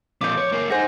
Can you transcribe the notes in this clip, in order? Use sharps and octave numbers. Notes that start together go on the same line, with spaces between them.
F2 A#2 D6 G6
C#5
F#2 A#3
D#4 G#4 C5 F#5 A#6